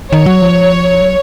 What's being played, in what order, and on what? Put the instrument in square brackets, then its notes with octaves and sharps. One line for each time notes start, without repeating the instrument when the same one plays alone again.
[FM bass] D#3 [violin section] C#5
[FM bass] F#3
F3
F#3